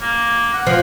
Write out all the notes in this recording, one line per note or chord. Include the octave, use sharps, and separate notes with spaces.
A#3
F#5
F3